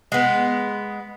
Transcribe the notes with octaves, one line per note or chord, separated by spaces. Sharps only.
G#3 B3